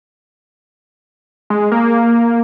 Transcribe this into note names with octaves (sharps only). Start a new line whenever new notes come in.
G#3
A#3